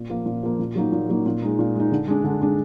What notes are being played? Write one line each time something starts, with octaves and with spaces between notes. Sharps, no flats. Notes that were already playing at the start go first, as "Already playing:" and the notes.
Already playing: A#2
F3 A#3
A#2
F3 A#3
A#2
F#3 A#3 D#4
A#2
F#3 A#3 D#4
A#2
G#3 D#4
A#2
G#3 D#4
D3
G#3 D4
D3
G#3 D4